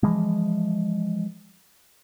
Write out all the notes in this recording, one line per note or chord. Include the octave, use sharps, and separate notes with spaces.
E3 F3 G#3